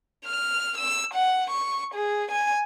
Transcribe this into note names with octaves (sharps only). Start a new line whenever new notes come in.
F6
E6
F#5
C#6
G#4
G#5